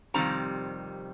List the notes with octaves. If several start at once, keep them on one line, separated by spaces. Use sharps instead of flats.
F2 C3 D#3 G3 C4 A#5